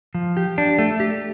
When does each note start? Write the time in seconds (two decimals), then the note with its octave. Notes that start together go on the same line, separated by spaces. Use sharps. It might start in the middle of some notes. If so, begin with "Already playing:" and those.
0.15 F3
0.37 G4
0.58 D4
0.78 A3
1.00 G4